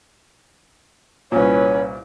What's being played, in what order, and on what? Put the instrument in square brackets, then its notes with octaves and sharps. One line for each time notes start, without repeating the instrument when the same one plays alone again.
[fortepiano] C2 A#2 [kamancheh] C#4 B4 [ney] C#5